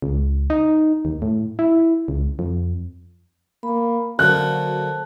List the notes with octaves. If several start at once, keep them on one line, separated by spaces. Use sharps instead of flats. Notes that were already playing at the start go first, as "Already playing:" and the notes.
C#2
D#4
D#2
A2
E4
C#2
F2
A#3 B5
D3 F#3 A#3 F#4 A4 C5 A5 F#6